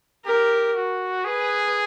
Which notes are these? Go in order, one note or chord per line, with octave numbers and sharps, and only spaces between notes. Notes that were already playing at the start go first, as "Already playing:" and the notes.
G4 A#4
F#4
G#4 B4